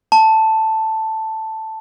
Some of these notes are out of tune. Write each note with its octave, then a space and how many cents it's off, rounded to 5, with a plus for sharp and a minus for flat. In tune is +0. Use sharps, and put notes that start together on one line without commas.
A5 +5